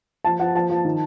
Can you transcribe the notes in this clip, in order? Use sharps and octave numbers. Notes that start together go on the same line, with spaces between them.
F3 A5
F3 F#5
F3 A5
F3
D#3